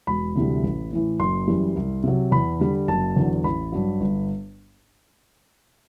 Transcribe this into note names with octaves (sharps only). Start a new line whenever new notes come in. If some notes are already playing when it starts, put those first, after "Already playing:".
E1 B5
D2 C3 E3 G3
A1
A2 E3
F#1 C6
F#2 E3 G3
C2
C3 F#3
E2 B5
D3 G3
F#1 A5
E2 D3 F#3
A1 B5
G2 F#3
G1